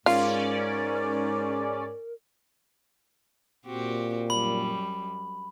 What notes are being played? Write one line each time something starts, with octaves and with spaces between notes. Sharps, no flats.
G#2 C#4 F4 A#4 D5
A#2 C4 F#4 G4
F#2 G3 B5